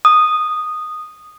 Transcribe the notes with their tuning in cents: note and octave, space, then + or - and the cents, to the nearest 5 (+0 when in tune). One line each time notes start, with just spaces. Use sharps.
D#6 -10